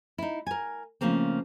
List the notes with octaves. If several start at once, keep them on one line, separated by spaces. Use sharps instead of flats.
D#4 E4
A#4 G#5
C#3 F3 A3 A#3 C4